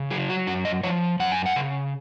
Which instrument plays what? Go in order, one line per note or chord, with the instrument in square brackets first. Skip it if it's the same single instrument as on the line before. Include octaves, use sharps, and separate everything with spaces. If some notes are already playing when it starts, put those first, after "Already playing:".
Already playing: [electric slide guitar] C#3
F#3 G#4
F#4
F#2 F#4
D#5
F3 C#5
F#2 F#5
G#5
F#5
C#3